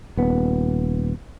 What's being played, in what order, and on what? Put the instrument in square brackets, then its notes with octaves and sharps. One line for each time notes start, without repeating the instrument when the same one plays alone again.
[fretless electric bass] D#1 B3